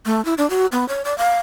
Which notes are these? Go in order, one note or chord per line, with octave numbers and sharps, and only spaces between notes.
A3
E4
D4
F#4
B3
C#5
D5
F5